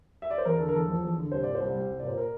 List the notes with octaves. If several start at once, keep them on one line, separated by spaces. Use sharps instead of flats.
E5
D5
C5
E2 A#4
D3 A4
A#4
E2 A4
F3
E2
D3
C2 C5
A#2 D5
C5
C2
G3
C2
A#2 D5
C5
A#4